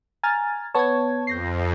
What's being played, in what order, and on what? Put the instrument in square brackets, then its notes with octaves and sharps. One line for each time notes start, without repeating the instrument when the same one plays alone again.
[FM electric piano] G#5 [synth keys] A#5 F6 A6
[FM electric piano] B3 C#5 [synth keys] A5 C#6 G#6
[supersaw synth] F2 [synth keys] G6 A#6 C7